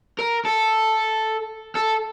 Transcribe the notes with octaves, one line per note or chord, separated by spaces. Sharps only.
A#4
A4
A4